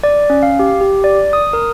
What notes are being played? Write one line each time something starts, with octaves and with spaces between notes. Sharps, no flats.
D5
C#4
F5
G4
G4
D5
D#6
A#4